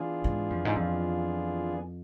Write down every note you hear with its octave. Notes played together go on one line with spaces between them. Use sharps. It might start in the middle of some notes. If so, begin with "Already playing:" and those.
Already playing: E3 B3 D4 F4 G#4
G#2
F2
G#2
F2